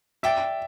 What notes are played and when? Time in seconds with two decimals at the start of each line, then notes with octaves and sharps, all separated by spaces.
0.23 D5 E5 G5 D6